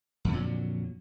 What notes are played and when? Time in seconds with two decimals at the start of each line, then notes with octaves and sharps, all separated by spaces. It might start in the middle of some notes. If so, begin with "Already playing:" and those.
0.25 F2
0.29 D3
0.33 A#2
0.37 F#3